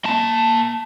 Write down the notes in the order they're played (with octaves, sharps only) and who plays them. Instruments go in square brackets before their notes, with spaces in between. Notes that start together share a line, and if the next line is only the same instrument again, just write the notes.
[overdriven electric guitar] A#3 A5